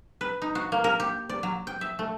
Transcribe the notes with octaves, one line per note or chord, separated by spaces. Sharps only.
B4
D#4
F#4
A#3
A#4
G4
D5
F#3
G5
E5
A3